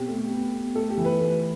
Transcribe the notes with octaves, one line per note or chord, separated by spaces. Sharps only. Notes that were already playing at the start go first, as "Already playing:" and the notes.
Already playing: B2 C4 G4
A3
B3
B3
A3 A4
G4
E3
B4
A3